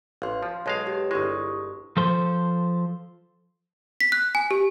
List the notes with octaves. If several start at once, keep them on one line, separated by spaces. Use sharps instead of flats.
A1 F5 C6
F3
B1 G#3 C#5 F5 A5
G4 C#5
G1 G#3 E4 C#6 D#6
F3 A4 C5
B6
F#6
G#5
G4